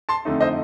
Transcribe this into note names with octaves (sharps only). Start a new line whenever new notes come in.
A5 C6
F2 D3 A3 D#4
C5 D#5